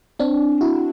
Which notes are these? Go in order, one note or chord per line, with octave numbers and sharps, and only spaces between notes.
C4 D4
E4 F#4